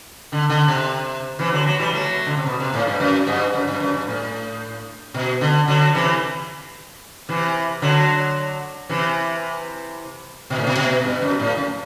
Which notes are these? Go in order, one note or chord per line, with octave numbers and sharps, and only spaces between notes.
D3
D3
C3
C3 E3
D3 F#3
F#3 A3
E3 G3
F#3 A3
D3
C3
B2
C3
A2
G2
F#2
G2
F#2
G2
F#2
G2
A2
B2
D3
D3 F#3
C3 E3
C3 E3
D3 F#3
C3 E3
B2
A2
B2
B2
G2
F#2
A2
F#2